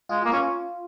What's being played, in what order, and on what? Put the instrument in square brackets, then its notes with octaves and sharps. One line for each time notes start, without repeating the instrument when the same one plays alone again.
[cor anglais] G#3 [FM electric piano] F4
[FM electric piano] F4
[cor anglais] A#3
[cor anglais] C#4 [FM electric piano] F4